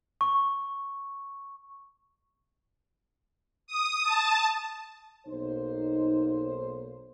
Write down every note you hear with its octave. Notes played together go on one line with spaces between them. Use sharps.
C#6
D#6
A5
B1 A#3 D#4 C5